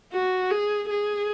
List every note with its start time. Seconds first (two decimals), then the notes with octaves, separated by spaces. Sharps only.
0.13 F#4
0.51 G#4
0.90 G#4